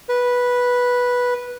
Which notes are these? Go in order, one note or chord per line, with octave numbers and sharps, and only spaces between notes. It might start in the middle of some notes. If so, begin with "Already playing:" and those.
B4